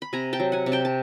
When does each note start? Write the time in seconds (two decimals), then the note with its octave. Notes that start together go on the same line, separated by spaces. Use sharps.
0.02 B5
0.13 C3 G#5 A#5
0.33 G5 A5
0.40 F#3
0.52 F#5 G#5
0.66 C3
0.72 G5 A5
0.85 A5